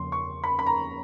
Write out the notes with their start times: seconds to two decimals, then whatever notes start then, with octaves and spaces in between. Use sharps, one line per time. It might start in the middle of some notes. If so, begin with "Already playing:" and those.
Already playing: E2 C#3 F3 A#3 C#4 C6
0.12 C#6
0.44 B5
0.59 B5
0.66 A#5